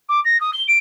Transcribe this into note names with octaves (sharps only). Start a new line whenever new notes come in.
D6
A#6
D#6
G7
D7